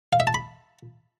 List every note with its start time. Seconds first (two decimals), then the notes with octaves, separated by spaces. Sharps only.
0.13 F5
0.20 E5
0.27 A5
0.34 B5